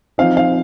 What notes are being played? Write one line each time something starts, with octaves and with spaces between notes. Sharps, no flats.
F3 C4 D#4 F5
F5